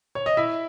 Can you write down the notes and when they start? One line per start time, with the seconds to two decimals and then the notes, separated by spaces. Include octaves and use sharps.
0.15 C#5
0.26 D#5
0.37 E4 E5